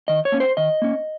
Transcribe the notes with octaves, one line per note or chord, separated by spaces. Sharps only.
D#3 D#5
C#5
A#3 C#4
C5
D#3 D#5
A#3 C#4